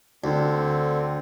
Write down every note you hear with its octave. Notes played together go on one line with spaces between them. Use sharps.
D2 D3 C4